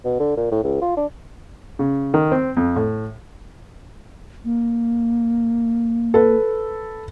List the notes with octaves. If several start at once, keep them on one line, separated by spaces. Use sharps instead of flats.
B2
D3
A#2
A2
C#2
F4
D4
C#3
D#3
C4
F2
A2
A#3
A4 B4